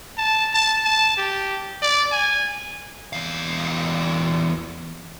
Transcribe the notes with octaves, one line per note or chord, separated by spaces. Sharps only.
A5
A5
A5
G4
D5
G#5
E2 F5